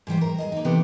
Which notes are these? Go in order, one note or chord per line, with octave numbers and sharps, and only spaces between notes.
G#2 E3 G3 C5
A#4
G#4 A#4 D#5
A#3 D#4
C3 E3 A#3 B3 G4 A4